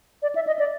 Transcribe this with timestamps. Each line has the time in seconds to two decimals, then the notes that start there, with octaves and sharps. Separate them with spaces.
0.22 D5
0.35 E5
0.47 D#5
0.59 D5